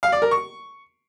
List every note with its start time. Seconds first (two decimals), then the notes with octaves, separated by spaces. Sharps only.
0.03 F5
0.12 D5
0.22 A#4
0.31 C#6